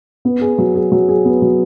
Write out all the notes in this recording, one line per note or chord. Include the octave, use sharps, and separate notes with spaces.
B3
G#4
F#3
G#4
F#3
G#4
B3
F#3